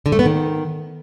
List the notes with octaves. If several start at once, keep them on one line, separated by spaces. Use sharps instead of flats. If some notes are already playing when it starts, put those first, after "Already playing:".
D3
A3
B3
D#3